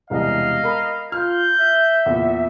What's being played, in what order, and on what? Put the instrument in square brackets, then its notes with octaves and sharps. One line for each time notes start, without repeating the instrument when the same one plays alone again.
[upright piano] E1 C2 E3 [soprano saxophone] D#5 [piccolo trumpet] F5
[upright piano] A#4 B5
[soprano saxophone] F4 [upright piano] F6 [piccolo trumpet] G6
[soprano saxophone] E5
[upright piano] E2 A#2